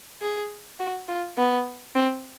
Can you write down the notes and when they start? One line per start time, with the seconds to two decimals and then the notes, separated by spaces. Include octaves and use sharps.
0.22 G#4
0.80 F#4
1.08 F4
1.38 B3
1.95 C4